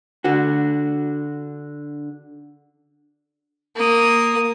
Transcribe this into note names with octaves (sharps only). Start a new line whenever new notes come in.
D3 F#4
A#3 D#6